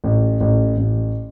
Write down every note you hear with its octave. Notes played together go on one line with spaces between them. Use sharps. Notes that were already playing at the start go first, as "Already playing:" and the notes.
A1
A1
A1